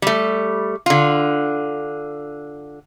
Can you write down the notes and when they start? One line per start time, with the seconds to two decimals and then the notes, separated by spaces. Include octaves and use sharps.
0.02 G3 A3
0.86 D3 F4